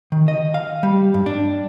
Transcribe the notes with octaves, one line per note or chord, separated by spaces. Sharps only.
D#3
D#5
F5
G3
G2
D4